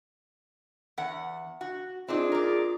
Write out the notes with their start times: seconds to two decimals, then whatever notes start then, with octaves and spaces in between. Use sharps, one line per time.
0.98 E2 F#5
1.61 F#4
2.08 C4 D4 D#4 F4 G#4
2.32 A#4 D5